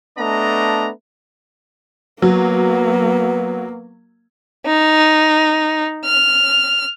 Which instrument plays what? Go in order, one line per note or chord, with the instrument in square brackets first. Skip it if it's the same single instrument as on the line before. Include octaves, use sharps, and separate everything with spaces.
[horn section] A3 B3 D4 D#5 A#5
[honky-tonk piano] F#3 [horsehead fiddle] A#3 [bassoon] B3
[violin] D#4
F6